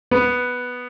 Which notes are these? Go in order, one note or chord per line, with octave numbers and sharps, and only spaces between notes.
B3